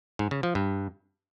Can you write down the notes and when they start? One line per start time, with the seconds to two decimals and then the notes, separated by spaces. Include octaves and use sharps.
0.19 G#2
0.31 C#3
0.43 F3
0.55 G2